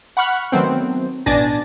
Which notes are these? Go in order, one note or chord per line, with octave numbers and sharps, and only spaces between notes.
F#5 B5 C#6 F6 F#6
D#3 F#3 A3 B3 C4
A1 B2 D4 G#5 A6 A#6